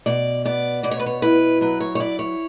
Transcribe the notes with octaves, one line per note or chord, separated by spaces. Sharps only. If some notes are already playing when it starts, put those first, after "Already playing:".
B2 D5
B3 D5
B2 D5
C#5
B4
C#5
E4 B4
F#3 B4
C#5
C#5
E4 D5
C#5